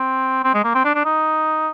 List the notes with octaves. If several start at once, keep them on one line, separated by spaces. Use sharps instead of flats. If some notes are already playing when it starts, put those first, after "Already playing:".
Already playing: C4
C4
G#3
A#3
C4
D4
D4
D#4